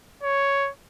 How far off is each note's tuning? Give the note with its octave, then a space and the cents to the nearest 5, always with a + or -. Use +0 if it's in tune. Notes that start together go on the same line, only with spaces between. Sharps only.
C#5 +5